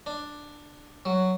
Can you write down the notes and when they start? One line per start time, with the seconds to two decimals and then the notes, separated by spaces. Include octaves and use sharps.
0.06 D4
1.05 F#3